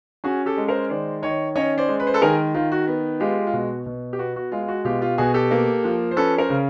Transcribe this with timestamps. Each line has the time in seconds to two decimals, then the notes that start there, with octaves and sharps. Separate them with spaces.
0.24 C#4 F#4 G#4
0.46 G4 A4
0.57 G#3
0.68 A#4 C5
0.90 D#3 C5 D5
1.22 D#3 C#5 D#5
1.55 C#4 C#5 D#5
1.78 C5 D5
1.88 G#3
2.00 B4
2.07 C5
2.14 A4 B4
2.21 D#3 G#4 A#4
2.54 D#3 F4
2.72 F#4
2.87 B3
3.20 G#3 F4 G4
3.47 F4
3.53 B2 F#4
3.86 B2
4.13 G4
4.19 B3 F#4
4.36 F#4
4.52 G#3 F4
4.63 F4
4.68 F#4
4.84 B2 F4 G4
5.01 F4 G4
5.18 B2 F#4 G#4
5.34 G4 A4
5.51 A#3
5.84 F3
6.11 C5
6.17 C#4 A4 B4
6.38 A#4 C5
6.50 C#3